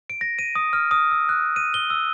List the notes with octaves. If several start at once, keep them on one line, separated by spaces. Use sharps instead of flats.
D7
A#6
D#7
D#6
F6
D#6
E6
F#6
D#7
G7
E6